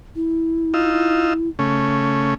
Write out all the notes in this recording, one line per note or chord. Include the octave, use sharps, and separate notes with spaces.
E4
D#4 F4 E6
C#3 A3 C#4